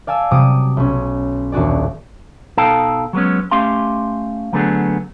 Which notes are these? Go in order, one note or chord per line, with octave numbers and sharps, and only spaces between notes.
D5 F5 G#5 A5 E6
C3 F#3 G3 D6 D#6 D#7
B1 C#4
D#1 D4 F#4 G#4 D5
B2 D#4 A4 F5 G5 A5
F#3 G#3 B3 C#4
A3 C#4 G4 F5 C6
D3 F#3 A3 B3 D4 G#4